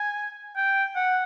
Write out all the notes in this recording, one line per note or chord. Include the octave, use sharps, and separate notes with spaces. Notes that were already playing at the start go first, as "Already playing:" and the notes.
Already playing: G#5
G5
F#5